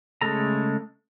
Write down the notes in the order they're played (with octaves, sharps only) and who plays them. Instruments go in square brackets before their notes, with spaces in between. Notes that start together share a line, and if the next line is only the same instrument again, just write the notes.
[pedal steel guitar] C#3 G#3 A3 A4 A#5